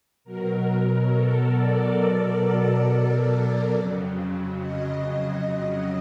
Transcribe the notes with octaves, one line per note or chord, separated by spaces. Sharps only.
B2 F#3 A#4
A4
D5
D5
F2 C#3 F#3
D#5